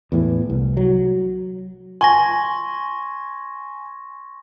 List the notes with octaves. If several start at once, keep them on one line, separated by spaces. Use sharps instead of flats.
E2 A2 E3
C2
F#3
G#5 C6 C#6 A#6